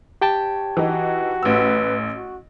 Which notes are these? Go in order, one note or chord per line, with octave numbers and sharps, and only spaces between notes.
G4 C#5 G5 A5
E3 D#4 F#4
A1 B4 E6
F#4